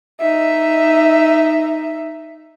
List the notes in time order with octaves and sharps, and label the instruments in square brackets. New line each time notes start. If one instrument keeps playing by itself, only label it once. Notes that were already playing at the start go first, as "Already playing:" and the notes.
[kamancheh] D#4 E5